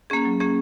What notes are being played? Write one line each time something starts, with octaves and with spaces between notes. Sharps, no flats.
A#3 C#4 G#4
F#3
A#3 C#4 G#4